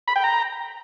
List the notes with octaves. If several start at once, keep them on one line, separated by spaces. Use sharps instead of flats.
B5
G5
A#5